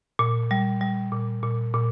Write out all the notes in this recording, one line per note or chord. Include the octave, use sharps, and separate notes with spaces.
A#2
G3
G3
A#2
A#2
A#2